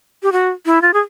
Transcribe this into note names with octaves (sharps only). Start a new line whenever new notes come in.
G4
F#4
E4
F4
G#4